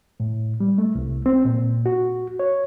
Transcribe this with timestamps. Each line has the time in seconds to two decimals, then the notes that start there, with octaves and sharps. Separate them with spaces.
0.20 A2
0.60 G3
0.78 A3
0.95 C2
1.26 C4
1.45 A#2
1.86 F#4
2.39 C#5